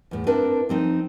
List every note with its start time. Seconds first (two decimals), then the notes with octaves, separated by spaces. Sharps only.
0.11 E2 A2
0.27 C4 D4 E4 A#4 B4
0.69 F3 C4 D#4